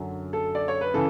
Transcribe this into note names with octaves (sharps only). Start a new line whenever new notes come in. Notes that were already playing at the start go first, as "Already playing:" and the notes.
Already playing: F#2 D3 F#3
A4
D5
C#5
B4
C#3 E3 A4